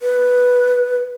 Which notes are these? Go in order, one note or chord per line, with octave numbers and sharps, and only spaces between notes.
B4